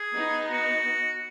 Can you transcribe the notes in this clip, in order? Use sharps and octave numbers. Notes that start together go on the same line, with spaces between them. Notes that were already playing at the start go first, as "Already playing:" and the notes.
Already playing: G#4
B3 D#4
F#4